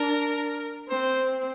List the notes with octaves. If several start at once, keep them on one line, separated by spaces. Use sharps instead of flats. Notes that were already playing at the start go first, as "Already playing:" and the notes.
Already playing: D4 A#4
C4 C5